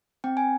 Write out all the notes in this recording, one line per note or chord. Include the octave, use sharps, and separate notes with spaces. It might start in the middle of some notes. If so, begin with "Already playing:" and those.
C4 G5
G#5